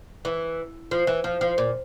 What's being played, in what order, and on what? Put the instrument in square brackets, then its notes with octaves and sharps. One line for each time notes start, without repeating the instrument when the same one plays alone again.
[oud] E3
F3
E3
F3
F3
A#2